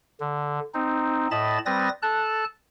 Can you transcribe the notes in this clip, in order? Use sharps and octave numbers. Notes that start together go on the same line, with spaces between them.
D3
C4 D#4
A2 D#5 A5 B5 A6
G3 C4 B4 D#6 A6 A#6
A4 A5 F#6